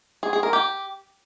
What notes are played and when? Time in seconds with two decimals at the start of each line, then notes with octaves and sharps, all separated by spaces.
0.23 G#4
0.33 G#4
0.43 A#4
0.53 G4